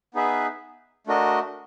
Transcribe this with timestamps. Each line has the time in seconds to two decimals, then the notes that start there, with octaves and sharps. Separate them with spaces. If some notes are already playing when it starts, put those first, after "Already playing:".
0.14 B3 D#4 G#4 B4 E5
1.07 A3 D4 F#4 A#4 D#5